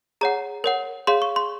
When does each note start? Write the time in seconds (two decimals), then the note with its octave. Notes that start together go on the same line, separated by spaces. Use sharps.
0.21 G#4 C#5 F#5 A#5
0.64 A#4 C#5 F#5
1.07 G#4 C#5 F5 C6
1.22 C#6
1.36 C6